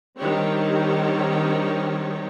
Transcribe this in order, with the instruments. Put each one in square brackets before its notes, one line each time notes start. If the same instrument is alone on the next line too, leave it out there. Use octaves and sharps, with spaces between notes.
[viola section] D#3 G3 C4 D4 G4 C#5